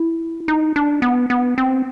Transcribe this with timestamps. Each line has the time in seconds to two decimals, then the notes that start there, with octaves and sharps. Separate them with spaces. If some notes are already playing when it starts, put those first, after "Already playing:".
Already playing: E4
0.48 D#4
0.76 D4
1.02 B3
1.30 B3
1.58 C4